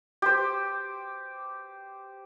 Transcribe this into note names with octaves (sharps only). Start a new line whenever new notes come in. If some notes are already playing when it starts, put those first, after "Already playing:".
G4 C5